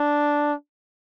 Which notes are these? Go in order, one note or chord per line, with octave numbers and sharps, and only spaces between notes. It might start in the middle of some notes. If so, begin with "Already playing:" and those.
Already playing: D4